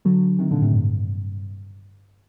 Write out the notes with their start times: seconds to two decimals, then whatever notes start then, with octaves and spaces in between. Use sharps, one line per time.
0.05 D3 F#3
0.39 C3 D#3
0.51 A#2 D3
0.62 A2 C3
0.73 G2